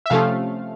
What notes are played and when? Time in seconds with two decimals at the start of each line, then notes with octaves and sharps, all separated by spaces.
0.06 E5
0.10 C3 F3 A3 C#4 F5